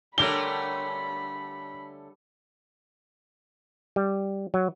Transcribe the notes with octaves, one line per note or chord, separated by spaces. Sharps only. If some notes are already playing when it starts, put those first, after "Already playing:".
D3 G3 A3 C#4 G4 A#4 B5 G7
G3
F#3